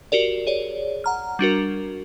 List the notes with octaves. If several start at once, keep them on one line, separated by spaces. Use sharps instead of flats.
F#4 G4 A#4 D5
G#4 C#5 D5
F#5 A#5 F6
G3 D4 F#4 A#4